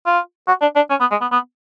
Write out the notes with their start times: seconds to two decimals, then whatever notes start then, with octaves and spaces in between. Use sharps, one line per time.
0.06 F4
0.48 F#4
0.62 D4
0.76 D4
0.90 C#4
1.00 B3
1.11 G#3
1.21 B3
1.32 B3